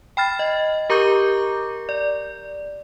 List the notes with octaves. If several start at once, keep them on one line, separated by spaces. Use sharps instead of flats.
G5 B5 F6 A6
D#5
G4 A#4 A#5 C#6 D6 G6
D5